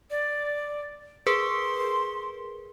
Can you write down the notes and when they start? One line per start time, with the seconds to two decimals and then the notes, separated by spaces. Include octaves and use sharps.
0.11 D5
1.27 G#4 A#4 B4 C6